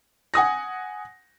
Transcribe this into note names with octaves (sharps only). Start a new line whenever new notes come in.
F#5 G#5 D#6 A#6